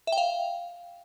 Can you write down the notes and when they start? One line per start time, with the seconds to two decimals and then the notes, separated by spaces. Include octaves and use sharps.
0.07 E5
0.12 G5
0.18 F5